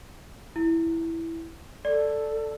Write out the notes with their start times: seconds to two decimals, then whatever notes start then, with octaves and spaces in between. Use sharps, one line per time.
0.56 E4
1.85 A4 D5